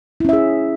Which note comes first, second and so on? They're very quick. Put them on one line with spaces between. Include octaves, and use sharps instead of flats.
E4 C#4 E5 G#4